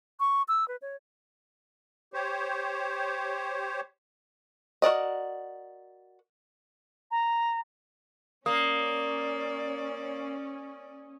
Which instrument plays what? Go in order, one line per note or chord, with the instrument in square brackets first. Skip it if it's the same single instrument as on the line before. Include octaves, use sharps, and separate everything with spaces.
[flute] C#6
E6
B4
C#5
[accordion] G4 C5 C#5
[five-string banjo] F#4 A#4 D5 D#5
[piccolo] A#5
[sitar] A#3 [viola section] C#4 [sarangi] D5 [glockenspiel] D#6